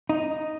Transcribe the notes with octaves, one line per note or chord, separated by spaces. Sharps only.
D#4